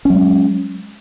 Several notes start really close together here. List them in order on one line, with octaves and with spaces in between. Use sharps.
C#4 F#3 G#3